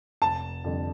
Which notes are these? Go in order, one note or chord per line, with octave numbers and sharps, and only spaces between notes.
F1 A5
F2 D3 G3 D4